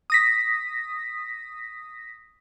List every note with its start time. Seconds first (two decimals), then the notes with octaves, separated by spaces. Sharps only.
0.10 D#6 A#6 B6